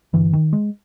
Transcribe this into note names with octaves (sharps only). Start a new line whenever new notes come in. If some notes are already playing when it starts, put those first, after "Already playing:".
G2 D3 E3
D#3
G#3